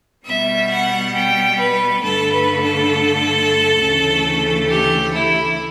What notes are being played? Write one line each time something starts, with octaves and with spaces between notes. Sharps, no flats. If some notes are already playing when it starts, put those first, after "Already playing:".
B2 G3 B3 E5
F#5
G5
B4
G2 D3 A3 A4
B4
A4
D2 C#3 E3 A3
G4
E4